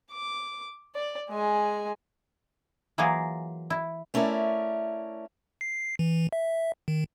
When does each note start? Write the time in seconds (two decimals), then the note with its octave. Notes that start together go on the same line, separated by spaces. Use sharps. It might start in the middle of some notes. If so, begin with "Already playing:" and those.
0.12 D6
0.95 D5
1.29 G#3 G#5
2.98 E3 F#3 A#3 F4 G#4 A#4
3.70 E4
4.14 A3 C#4 E4 A#4 D5
5.61 C7
5.99 E3
6.33 E5
6.88 D#3